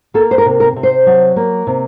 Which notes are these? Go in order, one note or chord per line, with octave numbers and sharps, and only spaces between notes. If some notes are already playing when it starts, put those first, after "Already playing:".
A#3 A4
C5
A#4
C3
A#4
C3
C5
F#3
A#3
C3